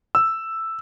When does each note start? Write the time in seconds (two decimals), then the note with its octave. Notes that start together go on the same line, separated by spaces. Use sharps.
0.15 E6